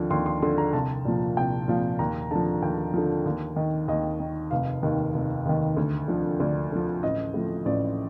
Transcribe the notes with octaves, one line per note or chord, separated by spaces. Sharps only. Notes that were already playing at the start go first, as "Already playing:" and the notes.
Already playing: D#2 D3 F3
D#2 C6
C6
D3 F3 C6
A#5
C2 A5
A#2 F3
C2 G5
A#2 F3 F5
D#2 A#5
D3 F3 A5
D#2 G5
D3 F3
D#2
D#3
D#2 D#5
D#3
F1 F5
D#2 D#3
F1
D#2 D#3
D2
D3 F3
D2 D5
D3 F3
A1 D#5
A2 F3
A1 D5